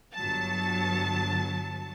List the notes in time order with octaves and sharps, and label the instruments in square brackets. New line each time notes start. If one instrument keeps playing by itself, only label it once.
[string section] G1 F#3 A5